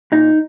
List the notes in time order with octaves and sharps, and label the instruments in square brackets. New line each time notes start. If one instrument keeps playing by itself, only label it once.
[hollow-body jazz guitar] A#2 D#4